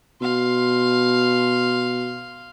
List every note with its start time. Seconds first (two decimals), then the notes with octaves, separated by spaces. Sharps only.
0.22 B2 F5 C6